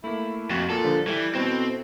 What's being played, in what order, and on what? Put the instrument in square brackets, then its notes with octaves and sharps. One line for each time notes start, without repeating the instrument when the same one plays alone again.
[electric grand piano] A3 A#3 [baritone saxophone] E4
[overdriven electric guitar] F2 [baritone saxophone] F#4
[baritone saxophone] A#2 [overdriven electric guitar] A4
[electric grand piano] D3 F3 G3
[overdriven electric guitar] E3 [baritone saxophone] G3 [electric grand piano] E4 A4 B4
[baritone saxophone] B2 [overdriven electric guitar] C4